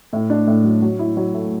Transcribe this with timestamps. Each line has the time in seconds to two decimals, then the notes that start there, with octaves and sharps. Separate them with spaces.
0.13 A2
0.30 D4
0.47 A2
0.64 F#3
0.82 F#3
0.99 E4
1.17 F#3
1.34 A3